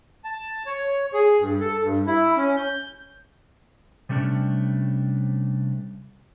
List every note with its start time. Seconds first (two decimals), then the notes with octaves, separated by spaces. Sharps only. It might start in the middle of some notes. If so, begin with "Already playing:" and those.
0.24 A5
0.66 C#5
1.14 G#4
1.39 G2
1.60 A4
1.82 G2
2.07 E4
2.37 C#4
2.57 G6
4.09 C3 G3 A3 C#4 D4